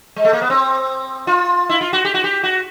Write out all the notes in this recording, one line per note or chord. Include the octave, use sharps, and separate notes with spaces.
G#3
A3
A#3
B3
C4
F4
E4
F4
F#4
G4
F#4
G4
F#4